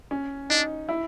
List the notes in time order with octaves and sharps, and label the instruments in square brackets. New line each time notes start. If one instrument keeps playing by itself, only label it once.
[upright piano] C#4
[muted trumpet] D4 [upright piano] D#4
[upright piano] E4